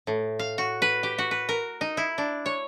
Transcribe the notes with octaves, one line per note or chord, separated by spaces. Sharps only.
A2
F5
F#4
B4
G4
F#4
B4
A#4
D#4
E4
D4
C#5